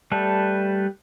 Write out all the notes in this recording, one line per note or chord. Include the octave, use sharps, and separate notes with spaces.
G3 A3 A4 B4